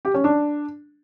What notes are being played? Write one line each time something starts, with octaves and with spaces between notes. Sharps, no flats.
G4
C#4
D4